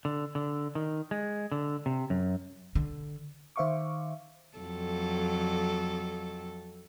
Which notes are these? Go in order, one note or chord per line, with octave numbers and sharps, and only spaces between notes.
D3
D3
D#3
G#3
D3
C3
F#2
D3
D#3 C5 E5 F5 C#6 D6
F2 F#3 A4